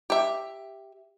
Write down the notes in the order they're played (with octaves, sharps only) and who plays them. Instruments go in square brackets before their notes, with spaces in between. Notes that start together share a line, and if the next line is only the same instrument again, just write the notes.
[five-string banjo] G4 E5